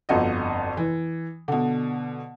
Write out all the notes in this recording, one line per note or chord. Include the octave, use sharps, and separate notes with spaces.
G1 F2 F4 F#4 D#5
E3
B2 D3